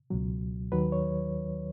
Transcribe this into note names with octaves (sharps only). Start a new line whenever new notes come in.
C#2 B2 F#3
D#2 D#3 F#3 B4
C#5